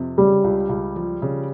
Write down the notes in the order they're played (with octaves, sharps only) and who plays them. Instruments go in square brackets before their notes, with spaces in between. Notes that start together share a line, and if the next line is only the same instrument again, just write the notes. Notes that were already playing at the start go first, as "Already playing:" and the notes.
Already playing: [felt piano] F2 C3
[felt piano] C#3 [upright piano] G3
[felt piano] C#2
C#2
F3
C#3